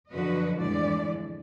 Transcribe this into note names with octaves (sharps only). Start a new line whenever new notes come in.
F#2 D3 F3 F#4 B4 D#5
F2 A2 D3 E3 G#3 D5